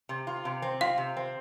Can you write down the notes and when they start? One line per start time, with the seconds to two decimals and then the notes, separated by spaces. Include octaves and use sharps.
0.09 C3
0.27 F4
0.45 C3
0.62 C4
0.81 F4 F5
0.98 C3
1.17 C4